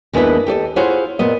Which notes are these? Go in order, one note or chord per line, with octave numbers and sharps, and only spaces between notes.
D#2 G#3 B3 D4 E4 B4
G4 A4 D5 D#5
E4 F4 G#4 C5 C#5 F#5
A#2 B3 D#5